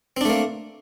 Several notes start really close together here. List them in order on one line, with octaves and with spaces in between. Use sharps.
C4 D4 A3 A#3